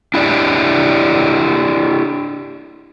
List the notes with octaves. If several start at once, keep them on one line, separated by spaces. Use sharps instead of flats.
D4 E4 G4 D5